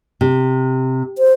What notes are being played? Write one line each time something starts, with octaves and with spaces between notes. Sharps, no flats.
C3
C5